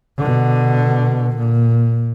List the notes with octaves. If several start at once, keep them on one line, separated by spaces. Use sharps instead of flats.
B2 D3
A#2